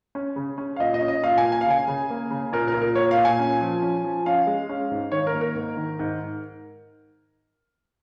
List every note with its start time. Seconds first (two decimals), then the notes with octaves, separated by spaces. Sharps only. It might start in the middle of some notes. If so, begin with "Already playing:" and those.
0.15 C#4
0.36 C#3
0.58 C#4
0.76 F5
0.80 A#2 D#5
0.94 D#5
1.01 C#4
1.08 D#5
1.23 A#2 F5
1.38 G#5
1.44 A#3
1.52 G#5
1.61 F5
1.66 C#3 G#5
1.88 C#3
2.10 A#3
2.31 C#3
2.53 A#2 A#4
2.68 A#4
2.74 A#2
2.82 A#4
2.95 A#3 C#5
3.11 F5
3.18 A#2
3.25 G#5
3.39 C#4
3.61 F3
3.82 C#4
4.04 F3
4.26 C#4 F5
4.47 G#3
4.69 C#4
4.91 G#2
5.12 D#3 C#5
5.27 A#4
5.33 A#3
5.41 A#4
5.55 G#2
5.77 D#3
5.99 G#2